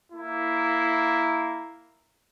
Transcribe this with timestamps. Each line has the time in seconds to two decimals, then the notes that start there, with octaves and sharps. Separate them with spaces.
0.13 A#3 E4